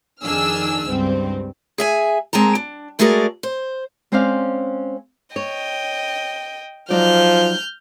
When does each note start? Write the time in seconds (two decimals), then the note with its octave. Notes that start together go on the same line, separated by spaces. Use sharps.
0.24 F2 D#3 D4 G#4 E6 F6
0.86 C#2 G2 C4
1.78 G#4 E5 G#5
2.33 A#2 G#3 C4 A5 A#5
2.55 D4
2.99 G#3 A3 F#4 G#4 A#4 D5
3.43 C5
4.12 G#3 C4 C#4 C5 D5 F5
5.36 C#5 D#5 G5
6.90 F3 F#3 D#4 D5 F6 G6